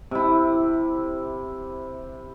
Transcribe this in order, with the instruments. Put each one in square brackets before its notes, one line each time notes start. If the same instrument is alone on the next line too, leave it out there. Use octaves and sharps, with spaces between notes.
[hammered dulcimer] C3 E4